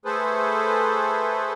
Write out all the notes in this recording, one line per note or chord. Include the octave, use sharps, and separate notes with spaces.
A3 G#4 A4 B4 C5